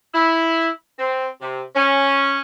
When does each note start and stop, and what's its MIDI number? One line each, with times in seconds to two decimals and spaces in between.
0.13 0.67 64
0.98 1.27 60
1.41 1.62 48
1.75 2.38 61